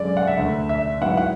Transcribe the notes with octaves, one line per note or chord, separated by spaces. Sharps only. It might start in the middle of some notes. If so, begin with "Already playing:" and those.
Already playing: F#2 D3 G#3 C#4 D5
F#5
E5
D2 D3 A3 D4
E5
G#2 F#3 B3 E4 F#5
F#5